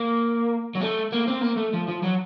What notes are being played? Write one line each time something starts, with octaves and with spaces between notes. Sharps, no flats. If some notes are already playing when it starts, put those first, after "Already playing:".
Already playing: A#3
F#3
A3
A#3
C4
A#3
A3
F3
F3
F#3